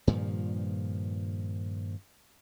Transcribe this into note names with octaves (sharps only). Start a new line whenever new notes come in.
G2 A#2 D#3 F3